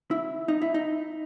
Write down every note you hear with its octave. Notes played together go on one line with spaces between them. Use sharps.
E4
D#4
E4
D#4